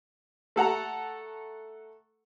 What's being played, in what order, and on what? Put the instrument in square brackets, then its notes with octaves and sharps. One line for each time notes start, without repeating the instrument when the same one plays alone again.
[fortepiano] A3 A4 F#5 A#5